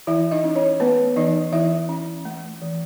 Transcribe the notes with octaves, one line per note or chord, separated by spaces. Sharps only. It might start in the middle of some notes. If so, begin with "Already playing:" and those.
E3 E4 E5
D#4 D#5
C#4
C#4 C#5
A3 B3 B4
E3 D#4 D#5
E3 E4 E5
C#4
A3
E3